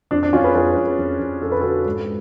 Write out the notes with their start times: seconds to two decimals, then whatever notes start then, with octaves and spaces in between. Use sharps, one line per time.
0.11 F2 D4
0.23 D4
0.33 F2 C#4 F4
0.44 G#4 B4
0.55 F2 G#4 B4
0.76 F2
0.99 F2
1.20 F2
1.42 F2 A4
1.52 B4
1.60 D3 F#4 A4
1.85 G#2